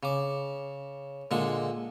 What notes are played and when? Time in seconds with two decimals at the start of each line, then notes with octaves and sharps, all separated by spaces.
0.03 C#3 D6
1.31 A#2 D3 G#3 G#5